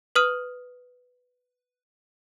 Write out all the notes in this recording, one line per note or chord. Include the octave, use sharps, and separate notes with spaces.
B4 D#6 F6 D#7